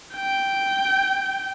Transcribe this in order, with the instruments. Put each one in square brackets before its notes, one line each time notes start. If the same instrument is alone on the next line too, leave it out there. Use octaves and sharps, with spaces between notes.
[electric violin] G5